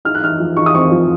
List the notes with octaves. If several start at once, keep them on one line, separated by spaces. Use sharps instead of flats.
D#4 F6
F#6
D#4 F6
F3
D#4 C#6
D#6
C4 C#6
F3